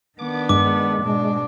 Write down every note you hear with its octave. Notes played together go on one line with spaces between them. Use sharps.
D#3 B3 D4 D6
G2 G#3 D6
G#2 B2 D4